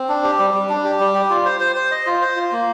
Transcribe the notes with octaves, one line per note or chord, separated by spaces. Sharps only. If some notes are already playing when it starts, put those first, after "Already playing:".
Already playing: C4
D4
G4
G3
G3
D4
G4
G3
G4
F4
C5
C5
C5
D#5
F4
C5
F4
A#3